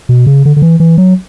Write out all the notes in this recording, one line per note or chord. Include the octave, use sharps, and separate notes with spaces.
B2
C#3
D3
D3
E3
E3
F#3